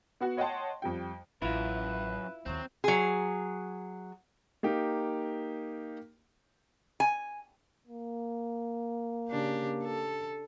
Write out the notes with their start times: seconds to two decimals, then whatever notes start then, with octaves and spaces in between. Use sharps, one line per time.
0.20 B3 F#4 F#5
0.37 C#5 D#5 F#5 G5 A5 C6
0.82 F2 G3 G5
1.42 A1 F#2 E4 F4 B4
2.46 D#2 D#3 F#3 C4
2.84 F#3 G#4
4.63 A#3 D#4 G4
7.00 G#5
7.88 A#3
9.29 C#3 D4 G4
9.84 A4